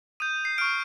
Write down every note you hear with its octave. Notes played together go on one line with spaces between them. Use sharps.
D#6 G6 D#7
C7
C#6 F6 D7